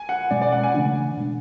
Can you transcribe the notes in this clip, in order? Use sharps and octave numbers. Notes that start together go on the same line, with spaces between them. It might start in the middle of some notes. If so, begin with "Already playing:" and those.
Already playing: G#5
F#5
B2 G#3 C#4 D5
D5
F#5
G#5
C#3 E3 A3 D4
B2 G#3 D4